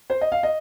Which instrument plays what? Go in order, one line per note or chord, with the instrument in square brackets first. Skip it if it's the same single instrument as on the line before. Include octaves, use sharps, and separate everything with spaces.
[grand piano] C5
D#5
F5
D#5